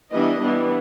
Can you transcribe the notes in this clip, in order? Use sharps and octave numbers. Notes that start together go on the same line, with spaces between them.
E3 G3 B3 D4 D#5
E3 G3 B3 D4